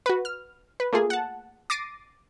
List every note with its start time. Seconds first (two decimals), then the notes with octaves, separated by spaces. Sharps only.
0.06 F#4 B4
0.25 F6
0.80 B4
0.93 A3 A#3 F4 G#4
1.10 F#5 A5
1.70 D6 A6 A#6 C7 D#7